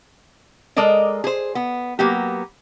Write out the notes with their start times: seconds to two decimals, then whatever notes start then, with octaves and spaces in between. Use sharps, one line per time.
0.76 G#3 A4 A#4 D5 D#5
1.24 G#4 C5
1.55 B3
1.99 F#3 A#3 B3 G4